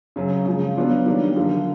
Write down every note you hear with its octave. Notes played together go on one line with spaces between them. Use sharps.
F#2 C#3 F#3
C#3 F3 G#3
F#3 B3 D4 F4
D#3 G3 A#3 D4
F#2 D3 F3 A#3